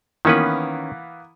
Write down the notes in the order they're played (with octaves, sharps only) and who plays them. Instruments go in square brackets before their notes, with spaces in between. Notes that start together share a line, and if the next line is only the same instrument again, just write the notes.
[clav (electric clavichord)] D#3 C#4 B4 [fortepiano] E3 A#3 B3